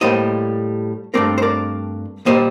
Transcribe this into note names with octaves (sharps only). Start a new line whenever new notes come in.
A2 G3 A#3 C5 D#5
G2 F#3 A3 C4 A#4 D5
C5
A#4 D5
A#2 G3 A#3 C5 D#5